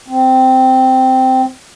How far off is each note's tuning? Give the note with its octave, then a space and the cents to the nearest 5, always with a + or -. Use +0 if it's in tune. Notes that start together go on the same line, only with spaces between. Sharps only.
C4 -10